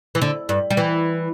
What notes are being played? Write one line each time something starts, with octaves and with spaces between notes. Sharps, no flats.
E3
D3
G2
G3
E3